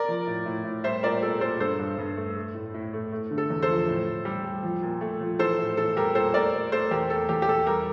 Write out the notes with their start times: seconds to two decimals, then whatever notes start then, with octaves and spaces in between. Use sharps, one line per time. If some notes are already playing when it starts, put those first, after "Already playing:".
Already playing: A#4 D5
0.08 F3
0.27 A2
0.46 A2
0.65 A2
0.84 G3 C5 E5
1.03 A#2 A#4 D5
1.21 A#2 A4
1.40 A#2 A4 C5
1.60 G2 A4 C5
1.79 G2
1.98 G2
2.16 A3
2.36 A3
2.55 A2
2.74 A2
2.93 A3
3.12 A3
3.31 D3
3.38 A4
3.50 E2
3.62 A4 C5
3.68 F3
3.88 A2
4.07 A2
4.25 G3
4.44 G3
4.63 F3
4.82 A#2
5.01 A3
5.21 F3
5.39 E3 A4 C5
5.59 A2
5.77 E3 A4
5.97 G3 G4 A#4
6.15 A#2 A4 C5
6.34 A3 A#4 D5
6.53 A3
6.72 A3 A4 C5
6.91 E2 G4 A#4
7.10 A3 A4
7.29 E2 G4
7.42 G4
7.49 E2 A4
7.66 G3 G4 A#4